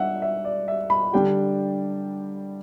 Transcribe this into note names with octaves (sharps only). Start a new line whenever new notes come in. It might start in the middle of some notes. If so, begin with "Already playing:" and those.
Already playing: G3 D4 E5 F#5
E5
D5
E5
B5
D3 G3 D4 G4 G5